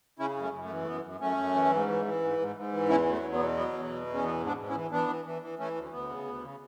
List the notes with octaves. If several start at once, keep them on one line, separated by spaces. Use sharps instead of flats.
C#3 C#4 E4
F#2
A3 C#4
F#2
A3
E3
A3
F#2 B3
F#2
F#2 A3 C#4
F#2
E3
G#2
E3
E3
G#2
G#2
G#2
E3
E2 C#4 E4
F#3
A3
E2
B3
B2
F#3 B3
E2
B2
E2
C#4
E3 B3
G#2
B3 D4
G#2
C#4 E4
E3
E3 B3 D4
E3
E3
E3
E3 A3 C#4
D2
D2 B3
C#3
D2
C#3